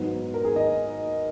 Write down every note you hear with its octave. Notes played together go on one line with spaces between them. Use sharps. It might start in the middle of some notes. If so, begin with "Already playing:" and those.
Already playing: G#2 F#3 B3 D#4
A#4
G#4
D#5